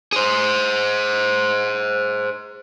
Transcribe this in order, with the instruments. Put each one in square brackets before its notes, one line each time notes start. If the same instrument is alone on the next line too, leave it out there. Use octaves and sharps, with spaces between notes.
[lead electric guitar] G#4 C5